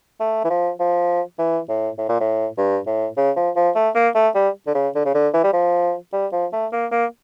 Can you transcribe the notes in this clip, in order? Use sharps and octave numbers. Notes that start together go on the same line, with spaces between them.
A3
E3
F3
F3
E3
A2
A2
A#2
A2
G2
A2
C#3
F3
F3
A3
A#3
A3
G3
D3
C#3
D3
C#3
D3
E3
G3
F3
G3
F3
A3
A#3
A#3